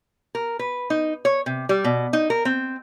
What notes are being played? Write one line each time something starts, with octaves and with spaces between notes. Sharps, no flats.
A#4
B4
D#4
C#5
C3
G3
B2
D#4
A#4
C4